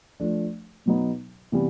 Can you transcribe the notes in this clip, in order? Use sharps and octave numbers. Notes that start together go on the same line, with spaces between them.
F3 A3 D4
B2 F#3 B3 D#4
C3 E3 G3 B3